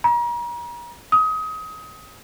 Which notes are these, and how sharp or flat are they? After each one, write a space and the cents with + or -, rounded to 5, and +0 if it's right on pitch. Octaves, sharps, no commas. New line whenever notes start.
A#5 +40
D#6 +25